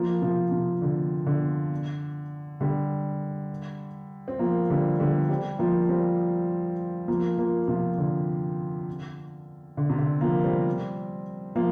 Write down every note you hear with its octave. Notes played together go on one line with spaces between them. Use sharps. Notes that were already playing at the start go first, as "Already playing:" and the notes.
Already playing: F3 A#3
C3 F3
C3
D3
D3
D3 G3
C4
F3 A#3
D3 G3
D3 G3
G3 C4
F3 A#3
G3 C4
F3 A#3
F3 A#3
C3 F3
D3
D3
C3
D3
F3 A#3
G3 C4
F3 A#3